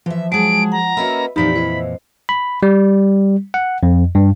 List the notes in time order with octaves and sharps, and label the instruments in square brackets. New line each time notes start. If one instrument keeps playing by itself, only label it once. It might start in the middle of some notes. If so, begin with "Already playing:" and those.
[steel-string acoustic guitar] E3 E5 [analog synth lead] F3
[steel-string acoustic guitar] F#3 G#4 [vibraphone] G#3 A5 D#6 [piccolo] D7
[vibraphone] F#5 [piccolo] A#5
[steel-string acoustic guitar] A#3 C#4 F#4 [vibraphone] B4 D#5 B5 [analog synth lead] E5
[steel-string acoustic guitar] F2 A#2 E3 [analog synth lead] D#4 [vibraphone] G4 D5 [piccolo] B5
[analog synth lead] E4 [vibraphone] C5 D#5
[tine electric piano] B5
G3
F#5
F2
G2